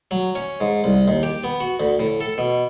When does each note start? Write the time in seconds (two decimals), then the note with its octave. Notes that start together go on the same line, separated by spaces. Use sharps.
0.11 F#3
0.35 C#4
0.60 G#2
0.84 C2
1.08 D#2
1.23 G4
1.44 B3
1.60 F#4
1.80 D2
1.99 A2
2.21 A4
2.38 B2